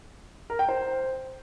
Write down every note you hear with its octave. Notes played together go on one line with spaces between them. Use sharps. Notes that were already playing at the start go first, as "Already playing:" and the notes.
A#4
G5
C5